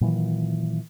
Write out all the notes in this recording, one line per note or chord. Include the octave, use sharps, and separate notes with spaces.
A#2 D#3 E3 F#3